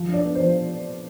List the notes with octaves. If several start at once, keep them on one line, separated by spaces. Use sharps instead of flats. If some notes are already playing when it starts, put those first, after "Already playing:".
Already playing: F3
D4
D5
B3
C5
F3